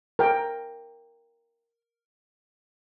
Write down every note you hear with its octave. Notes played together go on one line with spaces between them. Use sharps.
A#4 G5